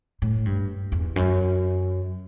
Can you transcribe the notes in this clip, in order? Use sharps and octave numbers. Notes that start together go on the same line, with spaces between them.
A2
G2
E2
F#2